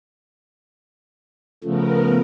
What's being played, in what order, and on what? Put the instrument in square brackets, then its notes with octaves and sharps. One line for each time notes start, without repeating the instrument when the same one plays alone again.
[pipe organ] C#3 F3 A3 [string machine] B3 A#4